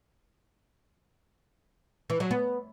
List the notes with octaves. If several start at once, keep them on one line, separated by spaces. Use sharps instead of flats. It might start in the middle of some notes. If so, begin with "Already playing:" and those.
E3
F#3
B3